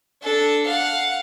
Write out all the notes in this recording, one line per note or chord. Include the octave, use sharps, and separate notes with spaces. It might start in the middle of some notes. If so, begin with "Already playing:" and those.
D4 A4
F5 F#5